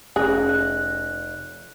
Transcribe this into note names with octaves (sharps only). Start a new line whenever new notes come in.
F1 C#4 G#4 F#6 A#6
F#6